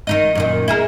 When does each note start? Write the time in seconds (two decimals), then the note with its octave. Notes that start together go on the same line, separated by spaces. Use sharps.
0.07 D#3 D#4 D#5
0.35 F#2 A#2 D#3
0.68 E4 G#4 A#4